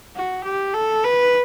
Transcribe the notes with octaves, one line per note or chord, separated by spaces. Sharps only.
F#4
G4
A4
B4